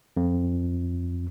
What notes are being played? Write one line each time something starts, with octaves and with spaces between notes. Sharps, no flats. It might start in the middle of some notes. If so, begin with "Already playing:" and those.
F2